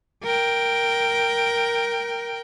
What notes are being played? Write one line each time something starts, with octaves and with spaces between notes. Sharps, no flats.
A#4 G5